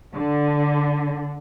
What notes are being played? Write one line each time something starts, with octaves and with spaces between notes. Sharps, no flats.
D3